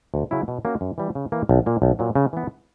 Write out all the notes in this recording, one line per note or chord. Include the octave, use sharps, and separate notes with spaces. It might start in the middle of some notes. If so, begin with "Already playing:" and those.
D2
C#3 F#3 C#4 E4
B2
A#3 C#4 F#4
F#2
E3 G3
C#3
E3 A#3
B1
A#2 A#3
B1
A#2 F#3
C#3
E3 B3